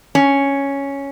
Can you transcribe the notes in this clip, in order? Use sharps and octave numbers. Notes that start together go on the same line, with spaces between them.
C#4